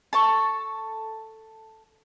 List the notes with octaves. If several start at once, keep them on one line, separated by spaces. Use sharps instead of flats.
A4 A5 C#6